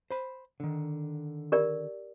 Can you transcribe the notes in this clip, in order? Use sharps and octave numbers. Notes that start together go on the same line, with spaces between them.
C5 B5
D3 D#3
G4 A#4 D5